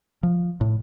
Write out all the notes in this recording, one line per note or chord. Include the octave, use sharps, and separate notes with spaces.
F3
A2